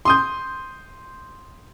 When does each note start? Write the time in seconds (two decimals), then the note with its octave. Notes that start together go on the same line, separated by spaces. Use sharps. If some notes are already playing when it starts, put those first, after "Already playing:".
0.05 C6 D#6 G6